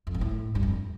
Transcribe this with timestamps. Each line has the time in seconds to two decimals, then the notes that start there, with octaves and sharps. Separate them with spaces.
0.07 F2
0.14 G2
0.21 A2
0.55 G2
0.63 F2